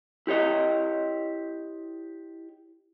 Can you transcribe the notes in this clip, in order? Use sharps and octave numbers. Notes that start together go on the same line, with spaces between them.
E4 G4 C#5 D#5